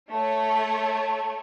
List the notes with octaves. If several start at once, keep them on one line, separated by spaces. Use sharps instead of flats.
A3 C#5